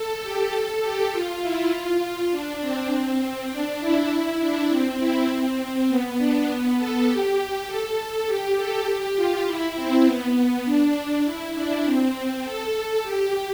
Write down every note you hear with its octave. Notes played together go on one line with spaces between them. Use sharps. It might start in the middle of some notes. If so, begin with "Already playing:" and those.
Already playing: A4
G4
A4
G4
F4
E4
F4
F4
D4
C4
D4
E4
D4
C4
E4
C4
B3
D4
B3
A4
G4
A4
G4
A4
G4
F4
E4
C4
B3
B3
D4
E4
D4
C4
A4
G4